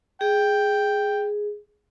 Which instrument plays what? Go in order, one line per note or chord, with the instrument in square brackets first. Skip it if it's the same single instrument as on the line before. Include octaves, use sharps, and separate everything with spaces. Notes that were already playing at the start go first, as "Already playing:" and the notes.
[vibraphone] G#4 [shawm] G5